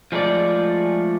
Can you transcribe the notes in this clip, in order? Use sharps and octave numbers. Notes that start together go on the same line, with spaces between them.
F3 G#3 A3 F4 D5